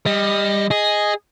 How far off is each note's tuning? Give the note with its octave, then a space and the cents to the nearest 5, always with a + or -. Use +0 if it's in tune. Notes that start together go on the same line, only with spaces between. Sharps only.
G3 +25 D#5 +5
G#4 +0 D#5 +0